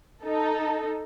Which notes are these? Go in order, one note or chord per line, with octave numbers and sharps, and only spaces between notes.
D#4 A4